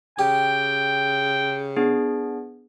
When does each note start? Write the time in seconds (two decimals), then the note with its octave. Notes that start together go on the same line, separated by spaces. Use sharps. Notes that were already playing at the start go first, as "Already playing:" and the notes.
0.19 C#3 G4 G5
1.77 B3 D4 G#4